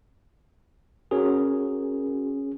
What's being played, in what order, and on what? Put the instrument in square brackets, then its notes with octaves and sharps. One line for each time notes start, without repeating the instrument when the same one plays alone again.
[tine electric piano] C#4 G#4 [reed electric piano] F#4 A#4